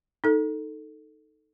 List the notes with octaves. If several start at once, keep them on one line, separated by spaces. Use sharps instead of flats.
D#4 A4